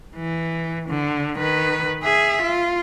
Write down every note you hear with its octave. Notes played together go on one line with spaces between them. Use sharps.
E3
D3
D#3 B4
G#4 E5
F4